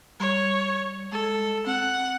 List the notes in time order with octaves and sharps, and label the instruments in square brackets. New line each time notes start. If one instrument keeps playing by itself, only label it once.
[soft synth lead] G3 [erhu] C#5
[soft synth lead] G#3 [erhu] A4
[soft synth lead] C4 [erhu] F#5